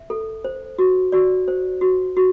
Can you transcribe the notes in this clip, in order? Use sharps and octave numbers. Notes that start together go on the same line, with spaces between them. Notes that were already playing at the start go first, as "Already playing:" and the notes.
Already playing: E5
A4
C5
F#4
F#4 D5
C5
F#4
F#4